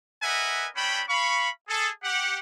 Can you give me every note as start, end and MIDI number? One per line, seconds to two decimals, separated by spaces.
0.23 0.68 70
0.23 0.68 71
0.23 0.68 75
0.23 0.68 76
0.23 0.68 78
0.23 0.68 80
0.76 1.03 57
0.76 1.03 61
0.76 1.03 62
0.76 1.03 79
0.76 1.03 83
1.08 1.49 77
1.08 1.49 83
1.08 1.49 85
1.68 1.89 68
1.68 1.89 69
2.03 2.39 67
2.03 2.39 78